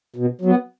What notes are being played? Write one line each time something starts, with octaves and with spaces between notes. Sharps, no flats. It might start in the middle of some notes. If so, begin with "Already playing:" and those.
B2
F#3 B3